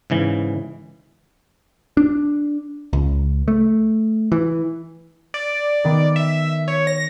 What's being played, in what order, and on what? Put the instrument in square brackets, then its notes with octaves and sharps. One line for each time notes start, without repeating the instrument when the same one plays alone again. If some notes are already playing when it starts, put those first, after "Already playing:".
[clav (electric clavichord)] G#2 C#3 E3
[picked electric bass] D4
C#2
A3
E3
[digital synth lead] D5
[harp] D#3 B3
[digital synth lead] E5
[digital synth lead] C#5 [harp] D#7
[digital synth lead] A#6